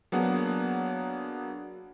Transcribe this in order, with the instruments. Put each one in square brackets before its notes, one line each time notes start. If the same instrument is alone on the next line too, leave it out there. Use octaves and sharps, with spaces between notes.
[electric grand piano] F#3 A#3 B3 D4 G#4 F#5